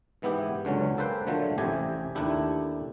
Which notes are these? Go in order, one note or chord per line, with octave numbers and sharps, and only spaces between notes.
G#2 E3 B3 E4 G4
C#2 D3 F#3 C#4
A#3 A4 B4 C5 G5
A#2 D3 F3 F#3 A3
A1 C3 E4 G4 G#5
D#2 A3 D4 E4 G4